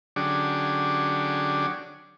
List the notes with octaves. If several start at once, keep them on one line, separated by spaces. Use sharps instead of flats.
D3 F#3 C#4 D4 G4 G#4